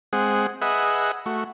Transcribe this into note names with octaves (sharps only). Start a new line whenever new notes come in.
G#3 C4 G#4 F#5
G#4 B4 D#5 E5 F#5
A3 F#4